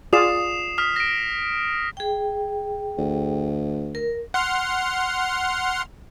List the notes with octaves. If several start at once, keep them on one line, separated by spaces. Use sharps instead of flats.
F4 G#4 D5 D#6 C7 E7
D#6 F6 B6
A#6 D7
G#4 G5
D2
A#4
F#5 C6 F6